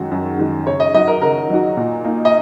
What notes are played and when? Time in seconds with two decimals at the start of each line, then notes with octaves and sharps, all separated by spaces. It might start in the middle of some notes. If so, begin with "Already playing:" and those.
Already playing: F#2 D#3 G#3 F#4
0.11 F#2
0.39 D#3 G#3 F#4
0.67 C#3 C#5
0.80 D#5
0.94 F#3 D#4 F#4 D#5
1.07 A#4
1.22 C#3 A#4
1.50 F#3 D#4 F#4
1.77 A#2
2.05 A#3 D#4
2.25 D#5